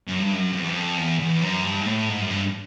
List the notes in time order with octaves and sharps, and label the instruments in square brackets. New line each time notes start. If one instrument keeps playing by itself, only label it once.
[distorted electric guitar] F#2
G2
F#2
F2
E2
F2
E2
E2
F#2
G2
G#2
A2
G#2
F#2
G2